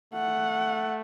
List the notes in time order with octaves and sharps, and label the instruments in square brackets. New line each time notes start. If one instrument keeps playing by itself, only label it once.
[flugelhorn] A3 [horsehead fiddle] F#5